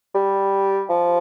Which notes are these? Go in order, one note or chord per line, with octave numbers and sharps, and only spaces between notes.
G3
F3